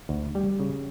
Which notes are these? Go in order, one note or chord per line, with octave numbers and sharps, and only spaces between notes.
D2
G3
C#3